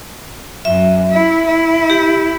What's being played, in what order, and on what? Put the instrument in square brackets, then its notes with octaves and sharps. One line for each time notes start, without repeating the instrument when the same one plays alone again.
[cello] F#2 [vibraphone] E5
[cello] E4
E4
[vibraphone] G4